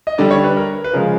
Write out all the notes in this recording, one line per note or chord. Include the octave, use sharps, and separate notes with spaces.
D#5
D3 G3 D5
C#5
B4
A#4
B4
C#3 F3 G#3 A#4